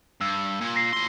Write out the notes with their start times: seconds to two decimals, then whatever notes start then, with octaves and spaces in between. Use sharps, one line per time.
0.21 G2 E6
0.61 A#2
0.76 A#6 C7
0.93 A2 C6